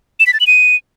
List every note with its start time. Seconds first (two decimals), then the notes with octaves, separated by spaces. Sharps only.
0.20 E7
0.27 B6
0.33 A6
0.40 F#7
0.47 D#7